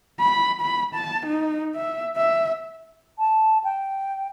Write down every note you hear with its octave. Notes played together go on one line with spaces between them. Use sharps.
B5
B5
A5
D#4
E5
E5
A5
G5